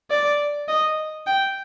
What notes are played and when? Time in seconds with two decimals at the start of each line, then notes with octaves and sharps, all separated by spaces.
0.10 D5
0.68 D#5
1.26 G5